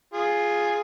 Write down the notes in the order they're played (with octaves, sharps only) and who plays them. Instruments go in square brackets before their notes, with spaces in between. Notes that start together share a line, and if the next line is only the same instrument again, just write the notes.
[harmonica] F4 G#4